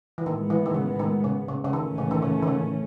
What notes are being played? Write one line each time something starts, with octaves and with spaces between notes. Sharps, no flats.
E3
A2 D#3 G#3 B3
E3
D#3
C#3
D#3
C#3
C#3
C#3
A2 D#3 E3 A3 C#4
C#3
D#3
C#3
D#3
C#3